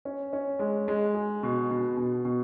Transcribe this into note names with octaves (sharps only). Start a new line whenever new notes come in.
C#4
C#4
G#3
G#3
G#4
B2
B2
B2
B2